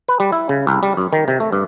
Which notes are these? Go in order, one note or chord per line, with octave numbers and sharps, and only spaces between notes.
B4
G3
E4
C#3
C2
G3
F#2
D#3
C3
A3
G2